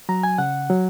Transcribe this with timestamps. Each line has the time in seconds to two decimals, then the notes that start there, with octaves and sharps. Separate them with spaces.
0.09 F#3 A#5
0.23 G#5
0.38 C#3 F#5
0.70 F#3